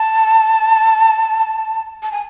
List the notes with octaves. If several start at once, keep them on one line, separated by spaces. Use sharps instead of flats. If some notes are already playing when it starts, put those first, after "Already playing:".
Already playing: A5
A5
G#5